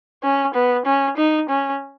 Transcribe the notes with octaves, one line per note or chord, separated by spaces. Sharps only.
C#4
B3
C#4
D#4
C#4